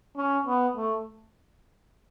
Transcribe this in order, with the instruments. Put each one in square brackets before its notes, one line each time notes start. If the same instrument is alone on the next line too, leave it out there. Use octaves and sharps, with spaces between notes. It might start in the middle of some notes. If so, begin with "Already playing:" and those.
[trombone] C#4
B3
A3